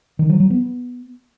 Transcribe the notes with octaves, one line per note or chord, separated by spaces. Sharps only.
D#3
F#3
F#3
B3